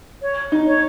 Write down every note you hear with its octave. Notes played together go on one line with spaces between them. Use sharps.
C#5
D#4
C#5